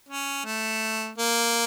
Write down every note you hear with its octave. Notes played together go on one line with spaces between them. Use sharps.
C#4
A3
A#3